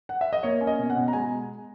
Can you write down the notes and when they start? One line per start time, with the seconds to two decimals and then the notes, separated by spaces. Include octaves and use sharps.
0.09 F#5
0.21 E5
0.33 D#5
0.43 A#3 C#5
0.61 C#4
0.67 D#5
0.79 B2
0.90 F#5
0.96 B2
1.08 A#5
1.13 G#3 G#5